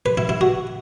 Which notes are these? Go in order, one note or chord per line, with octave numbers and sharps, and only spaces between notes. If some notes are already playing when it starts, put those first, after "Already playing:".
B4
E4
E4
F#4